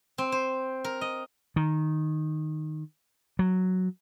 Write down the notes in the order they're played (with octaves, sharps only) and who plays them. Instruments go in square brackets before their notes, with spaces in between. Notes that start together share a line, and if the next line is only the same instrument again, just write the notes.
[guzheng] C4
C5
A#4
D#5
[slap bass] D#3
F#3